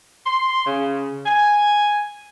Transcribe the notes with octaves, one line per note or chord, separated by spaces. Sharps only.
C6
C#3
G#5